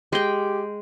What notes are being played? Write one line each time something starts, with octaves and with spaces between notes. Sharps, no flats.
G#3 G4 G5